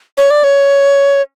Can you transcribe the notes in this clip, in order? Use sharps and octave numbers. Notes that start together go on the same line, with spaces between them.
C#5
D5
C#5